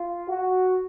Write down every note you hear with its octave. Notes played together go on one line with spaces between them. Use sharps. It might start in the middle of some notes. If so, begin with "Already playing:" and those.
Already playing: F4
F#4